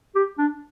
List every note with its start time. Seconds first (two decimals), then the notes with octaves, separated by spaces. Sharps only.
0.15 G4
0.38 D4